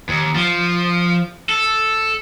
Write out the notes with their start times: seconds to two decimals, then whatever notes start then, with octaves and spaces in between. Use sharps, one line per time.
0.09 D#2
0.36 F3
1.49 A4